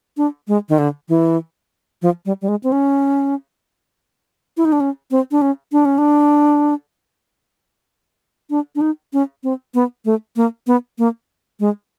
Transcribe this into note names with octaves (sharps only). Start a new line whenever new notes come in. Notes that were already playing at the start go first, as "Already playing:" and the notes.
D4
G#3
D#3
D3
E3
F3
G3
G3
G#3
C4
C#4
E4
D#4
D4
C#4
C4
D4
C#4
D4
C#4
D4
D4
D4
D#4
C#4
C4
B3
A3
A#3
B3
A#3
G#3